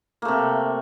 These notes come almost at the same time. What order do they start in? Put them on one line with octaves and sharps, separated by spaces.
A#3 A3 C3